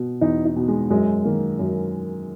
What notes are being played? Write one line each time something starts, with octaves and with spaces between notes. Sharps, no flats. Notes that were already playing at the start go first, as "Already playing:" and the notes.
Already playing: B2
E2 D#4
D#4
B2
G#3
F#2 G#3
D#3 A#3
F#2